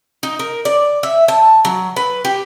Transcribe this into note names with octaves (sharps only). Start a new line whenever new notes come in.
D#4
A#4
D5
E5
A5
F#3
B4
G4